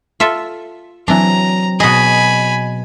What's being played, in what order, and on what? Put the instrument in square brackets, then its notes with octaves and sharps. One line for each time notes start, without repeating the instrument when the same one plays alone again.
[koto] F4 A4 E5
[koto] E3 D4 [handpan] F#3 C4 [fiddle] A#5
[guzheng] B2 D#5 [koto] B3 G#4 [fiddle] G#5 B5